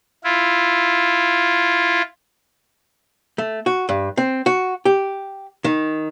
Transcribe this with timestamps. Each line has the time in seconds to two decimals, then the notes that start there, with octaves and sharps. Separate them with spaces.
0.24 E4 F4
3.38 A3
3.66 F#4
3.89 G2
4.17 C4
4.46 F#4
4.85 G4
5.64 D#3